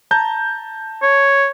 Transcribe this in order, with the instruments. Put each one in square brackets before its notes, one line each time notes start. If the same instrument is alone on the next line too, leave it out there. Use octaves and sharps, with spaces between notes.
[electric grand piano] A5 A#5 G6
[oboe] C#5